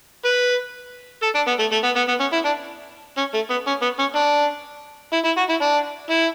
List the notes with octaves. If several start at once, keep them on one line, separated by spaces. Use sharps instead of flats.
B4
A4
D4
B3
A3
A3
B3
B3
B3
C#4
E4
D4
C#4
A3
B3
C#4
B3
C#4
D4
E4
E4
F#4
E4
D4
E4